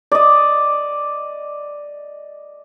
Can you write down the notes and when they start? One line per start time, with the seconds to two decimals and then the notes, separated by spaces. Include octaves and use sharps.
0.12 D5 D#5